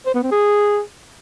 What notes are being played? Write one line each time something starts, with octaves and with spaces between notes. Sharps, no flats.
C5
B3
C4
G#4